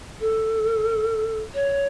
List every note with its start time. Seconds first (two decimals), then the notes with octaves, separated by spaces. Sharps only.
0.20 A4
1.54 C#5